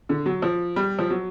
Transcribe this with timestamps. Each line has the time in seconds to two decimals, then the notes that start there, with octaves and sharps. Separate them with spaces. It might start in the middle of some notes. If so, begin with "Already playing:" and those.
0.09 D3
0.26 F#3
0.42 F3
0.76 G3
0.99 F3
1.10 F#3